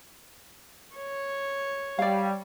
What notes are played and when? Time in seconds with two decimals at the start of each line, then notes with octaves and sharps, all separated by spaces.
0.96 C#5
1.99 G3 D5 F5